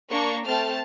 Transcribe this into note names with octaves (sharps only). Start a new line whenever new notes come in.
A#3 D4 A#5 C#6
A3 C4 A5 F6